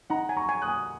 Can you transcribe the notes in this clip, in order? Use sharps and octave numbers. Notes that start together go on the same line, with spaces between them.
D#4 F#5 A#5
G#5
A#5 C#6
G#5
D#6 F#6
G#5